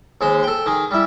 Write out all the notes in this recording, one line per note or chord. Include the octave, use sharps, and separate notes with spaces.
D#2 G#3 C5
A4 G5
D#3 G#4
G3 E4